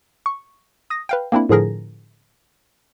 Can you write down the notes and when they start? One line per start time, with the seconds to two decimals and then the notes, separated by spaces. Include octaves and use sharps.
0.26 C#6
0.90 D#6 A#6
1.09 B4 F5 G5
1.32 A#3 C4 D4 E4
1.49 A2 D3 F3 G#4 A#4 A#6